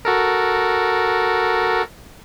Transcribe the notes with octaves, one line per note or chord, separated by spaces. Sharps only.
F#4 A4 A#4